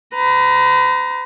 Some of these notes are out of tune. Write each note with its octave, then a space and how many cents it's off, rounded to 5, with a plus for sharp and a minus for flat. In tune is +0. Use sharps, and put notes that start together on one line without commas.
B4 +45 A#5 +20